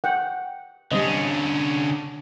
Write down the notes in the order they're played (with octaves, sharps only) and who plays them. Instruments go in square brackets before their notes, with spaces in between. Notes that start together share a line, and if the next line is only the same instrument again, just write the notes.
[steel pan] F#5 G5
[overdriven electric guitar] D3 C#4 [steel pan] G3 C4 D#5